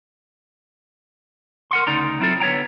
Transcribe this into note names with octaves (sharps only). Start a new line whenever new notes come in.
A#4 F#5 C6
D2 C#3 D#4 D5 A#5 C6
F#3 C4 E4 F4 A4
D3 B3 C#5 G5 A#5